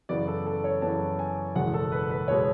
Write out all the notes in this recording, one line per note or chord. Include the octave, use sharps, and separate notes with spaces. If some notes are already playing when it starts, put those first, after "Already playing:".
F#2 C#3 E3 B3 D5
A4
A4
C#5
F#2 C#3 E3 B3 A5
G#5
F#1 E2 B2 G#3 F#5
A4
B4
B4
B2 G#3 C#5